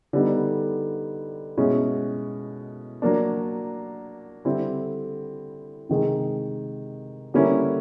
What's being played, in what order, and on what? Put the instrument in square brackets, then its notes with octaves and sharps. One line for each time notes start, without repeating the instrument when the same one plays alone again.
[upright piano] D3 G3 B3 D#4
B2 G#3 C#4 E4
F#3 A#3 D4
D3 G3 C4 E4
C3 D#3 G#3
D3 G3 A#3 C#4 E4